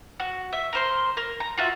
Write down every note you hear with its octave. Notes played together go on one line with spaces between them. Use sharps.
F#4
E5
A#4 C5 C6
A#4
A#5
F4 F#4 E5